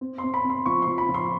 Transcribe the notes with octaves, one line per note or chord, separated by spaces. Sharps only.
C4
C6
C4
B5
C4
C6
F3 C#6
C6
F3
B5
F3
C6